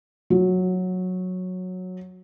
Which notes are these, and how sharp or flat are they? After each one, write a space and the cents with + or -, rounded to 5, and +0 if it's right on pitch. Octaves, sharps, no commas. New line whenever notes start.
F#3 -10